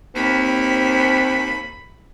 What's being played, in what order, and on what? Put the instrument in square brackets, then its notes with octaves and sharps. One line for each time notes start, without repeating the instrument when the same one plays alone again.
[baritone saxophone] D#2 [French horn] C4 [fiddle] B5